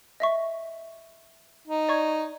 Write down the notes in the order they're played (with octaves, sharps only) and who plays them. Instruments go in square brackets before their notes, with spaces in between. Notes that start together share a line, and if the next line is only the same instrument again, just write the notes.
[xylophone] D#5 E5 C#6
[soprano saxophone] D#4
[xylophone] D5 C#6 G#6